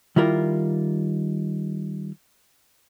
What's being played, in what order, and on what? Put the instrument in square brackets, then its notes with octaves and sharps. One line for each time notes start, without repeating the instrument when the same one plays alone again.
[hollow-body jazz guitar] D#3 G3 E4 F4 A#4